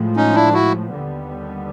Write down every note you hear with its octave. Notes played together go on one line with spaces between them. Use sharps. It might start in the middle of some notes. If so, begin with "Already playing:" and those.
Already playing: A2 F3 G#3
C#4 D#4
D4 E4
E4 F#4
D#2 D3 G3 B3